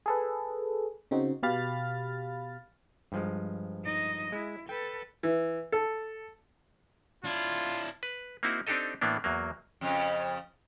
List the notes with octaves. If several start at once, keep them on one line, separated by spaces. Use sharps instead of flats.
G#4 A4 B4
C#3 C4 D#4 F#4
B2 G4 F5 B5 F6 A6
G2 F3 G#3
D#4 D#5
G#3 E4
A4 B4 G5
E3
A4
D4 E4 F4
B4
A#3 C4 D#4 E4 F#4
C4 D4 D#4 G4 A4 D#5
A2 E3 A#3 B3 D4
E2 F#3 A#3
F2 C#3